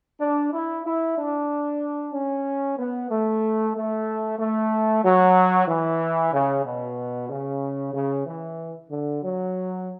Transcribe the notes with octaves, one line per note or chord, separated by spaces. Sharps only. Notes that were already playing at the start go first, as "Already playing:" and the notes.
D4
E4
E4
D4
C#4
B3
A3
A3
A3
F#3
E3
C#3
B2
C#3
C#3
E3
D3
F#3